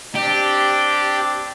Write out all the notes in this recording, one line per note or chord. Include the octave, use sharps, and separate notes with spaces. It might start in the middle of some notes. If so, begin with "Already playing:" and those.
C4 D4 G4 D5